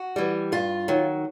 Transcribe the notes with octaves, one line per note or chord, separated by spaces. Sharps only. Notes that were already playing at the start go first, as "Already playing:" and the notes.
Already playing: F#4
E3 G3
G2 F4
D#3 F#3